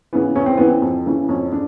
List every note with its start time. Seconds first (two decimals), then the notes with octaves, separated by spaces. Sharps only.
0.13 C#3 E3 B3
0.36 E2 C#4
0.46 C4
0.57 C#3 E3 B3
0.68 C4
0.82 F2
1.06 C#3 E3
1.29 F2 C#4
1.52 C#3 D4